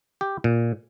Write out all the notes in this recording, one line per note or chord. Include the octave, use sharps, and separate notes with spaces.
G4
A#2